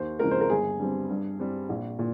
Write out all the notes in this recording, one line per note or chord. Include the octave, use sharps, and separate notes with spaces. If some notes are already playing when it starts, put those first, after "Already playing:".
Already playing: D#2 C5
C#3 F3 G#3 C4 A#4
C5
A#4
G1 G#4
G2 G3 C4
G2
G3 C4
A#1
A#2